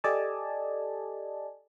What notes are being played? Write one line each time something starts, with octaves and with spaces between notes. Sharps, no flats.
G4 A4 D5 D#5 G#5 A5